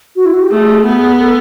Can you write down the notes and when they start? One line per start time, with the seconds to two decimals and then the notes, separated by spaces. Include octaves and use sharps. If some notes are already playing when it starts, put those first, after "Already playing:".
0.16 F#4
0.25 E4
0.34 F#4
0.42 G4
0.51 A3 G#4
0.85 B3
1.20 A4